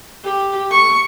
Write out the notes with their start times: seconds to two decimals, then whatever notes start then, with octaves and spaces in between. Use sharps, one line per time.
0.24 G4
0.71 C#6